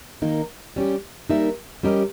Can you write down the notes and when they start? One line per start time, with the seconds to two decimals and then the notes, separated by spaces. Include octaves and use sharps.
0.22 D#3 A#3 D#4 A#4
0.76 G3 C#4 G4
1.29 G3 A#3 D#4 A#4 E5
1.83 G3 C#4 G4 A#4 D#5